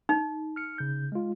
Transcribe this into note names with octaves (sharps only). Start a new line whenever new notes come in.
D#4
F6 C#7
C#3 G6
G#3 F4